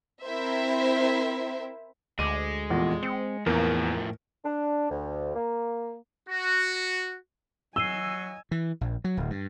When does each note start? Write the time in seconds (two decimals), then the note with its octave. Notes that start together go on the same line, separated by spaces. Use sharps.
0.23 C4 E4 A#4 C5 E5
2.19 D2 G#3 D6 D#7
2.70 F1 E2 A#2
3.03 C4 C#7
3.46 E2 A2 F3 A#3 A#4
4.45 D4
4.91 D2
5.36 A#3
6.28 F#4
7.76 F#3 D#5 G#5 E6 C7 D#7 G7
8.51 E3
8.81 A#1
9.04 F#3
9.17 D1
9.30 G2